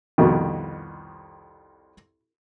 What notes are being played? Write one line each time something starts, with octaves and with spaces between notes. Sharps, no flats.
C2 F2 B2 D#3